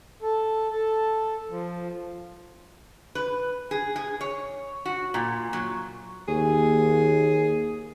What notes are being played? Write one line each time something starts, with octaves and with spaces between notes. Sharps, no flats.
A4
A4
F3
B4
G#4
G#4
C#5
F#4
A#2
F#3
D#2 G#4